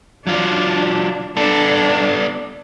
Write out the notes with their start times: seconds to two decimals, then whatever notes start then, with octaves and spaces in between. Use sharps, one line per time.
0.27 F#3 D4 F4
1.37 B3 D4 A4